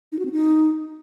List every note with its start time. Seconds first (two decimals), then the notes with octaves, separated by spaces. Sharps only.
0.12 D#4
0.19 F#4
0.25 C4
0.32 D#4